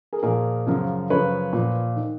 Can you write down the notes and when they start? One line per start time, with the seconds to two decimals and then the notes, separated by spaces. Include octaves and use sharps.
0.13 G#4 A#4
0.23 A#2 F3 G#4 A#4
0.67 F#2 C#3 F3
1.10 F#2 C#3 F3 B4 C#5
1.53 A#2 F3
1.96 D#3